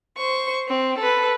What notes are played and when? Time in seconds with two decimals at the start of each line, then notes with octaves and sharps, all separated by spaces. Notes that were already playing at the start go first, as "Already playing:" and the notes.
0.18 C5 C#6
0.68 C4
0.99 A4 B4